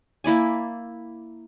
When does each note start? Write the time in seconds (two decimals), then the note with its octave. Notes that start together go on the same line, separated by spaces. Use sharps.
0.24 A#3 E4 D5 G#5